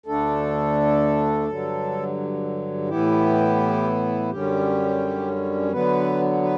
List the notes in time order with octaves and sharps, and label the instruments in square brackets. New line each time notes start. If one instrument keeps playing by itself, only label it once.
[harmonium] D2 D3 A3 D4 A4
G2 D3 F#3
A2 E3 B3 E4 G4
F#2 D3 G3 C#4 G4
D3 F#3 B3 B4
B4